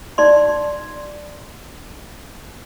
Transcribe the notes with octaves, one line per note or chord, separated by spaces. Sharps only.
D#4 D5 C6